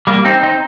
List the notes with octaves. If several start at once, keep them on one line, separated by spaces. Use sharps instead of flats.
G3 A#3
C4 D#4
C4 D#4